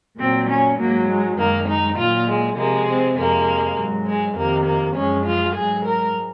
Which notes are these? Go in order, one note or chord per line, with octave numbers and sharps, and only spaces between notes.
A#2 F#3 C4
C#4
G#2 F#3 A#3
G#3
F#2 D#3 G#3 A#3
D#4
A#2 F#3 F4
G#3
C3 F3 G#3 A#3
C4
F2 C3 F3 G#3 A#3
G#2 F#3
G#3
F2 C3 D#3 A#3
A#3
F#2 F3 G#3 C#4
F4
G#2 F#3 G#4
A#4